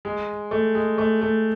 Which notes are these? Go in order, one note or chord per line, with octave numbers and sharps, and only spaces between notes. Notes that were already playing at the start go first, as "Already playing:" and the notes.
G#3
A3
G#3
A3
A3